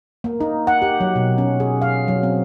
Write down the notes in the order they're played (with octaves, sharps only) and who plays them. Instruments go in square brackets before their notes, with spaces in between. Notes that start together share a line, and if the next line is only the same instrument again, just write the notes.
[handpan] A#3
D#4
F#5
G4
F#3
B2
C#4
G#4
F5
F#3
C4